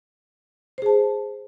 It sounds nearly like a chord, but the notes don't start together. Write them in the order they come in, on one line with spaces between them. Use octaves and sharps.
C5 G#4 A5